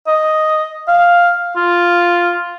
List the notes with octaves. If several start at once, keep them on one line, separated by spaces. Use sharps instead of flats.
D#5
F5
F4